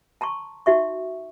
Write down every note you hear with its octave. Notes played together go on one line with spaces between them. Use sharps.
A5 A#5 C6 C#6
D#4 F#4 E5 C#6